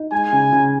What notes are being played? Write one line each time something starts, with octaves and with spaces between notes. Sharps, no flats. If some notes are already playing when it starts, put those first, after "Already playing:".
Already playing: D#4
G#3 G#5
C#3
C#3